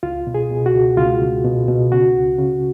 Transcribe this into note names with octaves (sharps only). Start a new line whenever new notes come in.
C#2 F4
B2
G#4
B2
F#4
C#2
C#2 F4
C#2
B2
B2
C#3 F#4
C#2
C#3